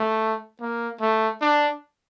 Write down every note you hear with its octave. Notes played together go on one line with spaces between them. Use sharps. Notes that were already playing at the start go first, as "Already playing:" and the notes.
Already playing: A3
A#3
A3
D4